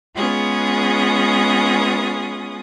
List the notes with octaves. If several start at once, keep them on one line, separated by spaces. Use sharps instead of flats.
G#3 B3 C#4 F4 G#4 D#6